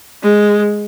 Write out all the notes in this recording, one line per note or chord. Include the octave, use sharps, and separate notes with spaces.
G#3